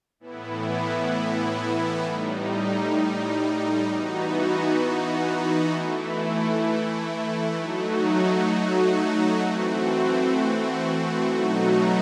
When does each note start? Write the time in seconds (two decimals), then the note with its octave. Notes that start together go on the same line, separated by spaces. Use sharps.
0.20 A2 E3 B3 E4
2.03 A2 G3 D#4
3.88 E3 B3 D#4 F#4
5.72 E3 A3 E4
7.57 F#3 A3 D#4 F#4
9.41 E3 A3 C4 F#4
11.25 B2 F#3 A3 D#4 F#4